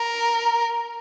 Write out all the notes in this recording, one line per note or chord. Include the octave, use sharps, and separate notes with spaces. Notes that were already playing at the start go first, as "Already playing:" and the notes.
Already playing: A#4